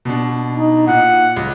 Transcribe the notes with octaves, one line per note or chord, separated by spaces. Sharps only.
B2 D4
D#4
A#2 F#5
C#2